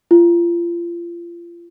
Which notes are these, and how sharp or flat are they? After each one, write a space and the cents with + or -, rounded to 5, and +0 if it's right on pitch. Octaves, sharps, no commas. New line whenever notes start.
F4 -30